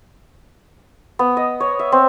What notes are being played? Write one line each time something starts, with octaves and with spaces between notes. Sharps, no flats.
B3
D#5
C#5
E5
C4